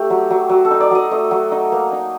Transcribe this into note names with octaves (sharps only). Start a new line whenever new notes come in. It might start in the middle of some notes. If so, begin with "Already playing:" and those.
Already playing: A3 G4
F#3
F#3
F#3
A4
D#4
D5
F#3 D#5
A3 D#5
F#3
D#4
A#3
D#4